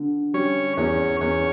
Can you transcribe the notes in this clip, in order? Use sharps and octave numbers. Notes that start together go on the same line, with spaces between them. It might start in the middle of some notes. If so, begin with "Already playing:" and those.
Already playing: D3
G3 C#4 C#5
E2 C#4 C#5
E2 C#4 C#5